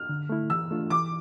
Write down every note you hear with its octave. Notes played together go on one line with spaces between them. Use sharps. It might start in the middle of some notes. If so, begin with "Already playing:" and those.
Already playing: F6
D3
A3 E4
E3 E6
A3 D4 F4
E3 D6